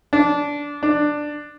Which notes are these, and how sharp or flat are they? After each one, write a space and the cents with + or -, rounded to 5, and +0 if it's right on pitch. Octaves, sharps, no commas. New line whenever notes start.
D4 -15
D4 +10